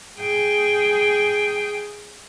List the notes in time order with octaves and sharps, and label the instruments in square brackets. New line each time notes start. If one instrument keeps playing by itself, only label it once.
[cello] G#4 G5